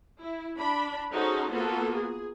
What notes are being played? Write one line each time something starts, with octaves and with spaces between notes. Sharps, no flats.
E4
D4 B5
C#4 D#4 F#4 G#4 A4 C5
A#3 B3 F4 F#4 A4
G#4